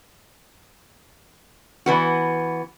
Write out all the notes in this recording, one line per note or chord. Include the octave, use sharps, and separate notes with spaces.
E3 B3 F#4